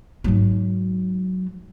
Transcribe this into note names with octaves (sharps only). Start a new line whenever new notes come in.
G#2 F#3